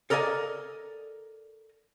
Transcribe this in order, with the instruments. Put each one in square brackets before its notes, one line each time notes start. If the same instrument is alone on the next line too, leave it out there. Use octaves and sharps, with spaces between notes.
[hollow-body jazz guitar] A4 A#4 D5 D#5 F5 G#5